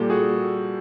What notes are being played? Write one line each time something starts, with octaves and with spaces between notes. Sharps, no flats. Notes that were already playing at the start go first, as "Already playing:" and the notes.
Already playing: A#2 G3 A#3 G4 A4
F#4 G#4